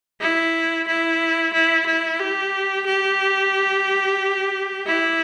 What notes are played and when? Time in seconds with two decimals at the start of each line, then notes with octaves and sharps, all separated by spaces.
0.21 E4
0.87 E4
1.53 E4
1.86 E4
2.20 G4
2.86 G4
4.86 E4